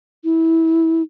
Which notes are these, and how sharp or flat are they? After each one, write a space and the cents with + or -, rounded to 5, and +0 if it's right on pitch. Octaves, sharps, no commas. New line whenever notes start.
E4 -20